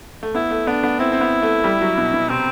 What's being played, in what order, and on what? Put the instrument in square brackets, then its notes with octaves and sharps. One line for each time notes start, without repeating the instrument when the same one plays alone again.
[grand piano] A3
[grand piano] B3 [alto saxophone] E4
[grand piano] A3
[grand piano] B3 [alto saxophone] D4
[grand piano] B3
[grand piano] C4 [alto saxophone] E4
[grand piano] C4
B3
A3
G3
F#3
B2
B2
[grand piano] C3 [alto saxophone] C4